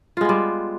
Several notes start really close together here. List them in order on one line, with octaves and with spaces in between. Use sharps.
F4 G#3 B3 G3